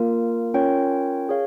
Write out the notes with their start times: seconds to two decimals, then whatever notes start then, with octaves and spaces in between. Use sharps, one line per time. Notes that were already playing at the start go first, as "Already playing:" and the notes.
Already playing: A#3 F4 A#4
0.54 C#4 F4 A#4 C#5 G5
1.29 G#4 C#5 F5